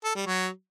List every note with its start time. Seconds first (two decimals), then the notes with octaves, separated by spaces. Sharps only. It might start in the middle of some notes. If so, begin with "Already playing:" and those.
0.04 A4
0.15 G3
0.26 F#3